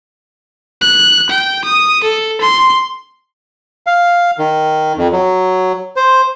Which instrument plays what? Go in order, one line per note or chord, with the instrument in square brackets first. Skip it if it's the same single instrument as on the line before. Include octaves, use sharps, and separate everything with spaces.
[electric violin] F#6
G5
D#6
A4
C6
[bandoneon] F5
D#3
F2
F#3
C5